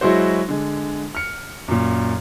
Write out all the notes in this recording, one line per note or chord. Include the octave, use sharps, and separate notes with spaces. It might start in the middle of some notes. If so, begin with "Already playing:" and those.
F#3 G#3 E4 F#4 C5
D3 G#3
F6 C#7
F#2 A#2